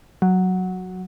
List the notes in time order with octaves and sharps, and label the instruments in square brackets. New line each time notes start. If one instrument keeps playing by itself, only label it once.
[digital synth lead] F#3